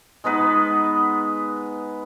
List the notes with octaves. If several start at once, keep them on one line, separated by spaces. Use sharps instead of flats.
G#3 B3 D#4 B4